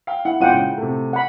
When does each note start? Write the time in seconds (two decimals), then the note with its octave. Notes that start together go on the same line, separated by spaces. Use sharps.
0.07 F5 G5
0.25 E4 F#5
0.41 G1 G#3 F4 F#5 G5 D#7
0.53 C#3
0.78 C3 A3
1.13 F#5 B5